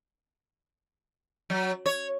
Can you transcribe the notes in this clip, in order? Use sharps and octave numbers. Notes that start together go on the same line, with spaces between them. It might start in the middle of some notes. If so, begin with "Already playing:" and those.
F#3
C#5